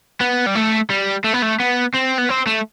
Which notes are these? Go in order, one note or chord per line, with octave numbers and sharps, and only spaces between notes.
B3
G3
A3
G3
A3
B3
A3
B3
C4
B3
C4
A3